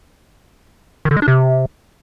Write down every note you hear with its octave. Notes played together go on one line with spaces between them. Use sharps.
D#3
D3
G#3
D4
C3